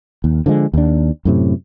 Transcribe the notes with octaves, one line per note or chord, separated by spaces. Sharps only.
D#2
D3 F3 F#3 G#3
D#2 D4
F#2 A2 C3